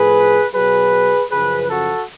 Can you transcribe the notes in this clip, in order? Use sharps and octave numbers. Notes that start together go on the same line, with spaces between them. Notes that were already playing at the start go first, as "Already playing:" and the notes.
Already playing: A2 F3 G#4 B4
B2 F#3 G#4 B4
F#2 C#3 F3 G#4 B4
F#4 A4